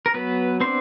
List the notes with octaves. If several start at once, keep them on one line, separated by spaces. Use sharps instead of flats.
A#4
F#3 B3 B4
B3 C4 D4 C5